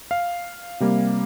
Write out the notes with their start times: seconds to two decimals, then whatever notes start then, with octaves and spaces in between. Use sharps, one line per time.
0.11 F5
0.80 C3 G3 A#3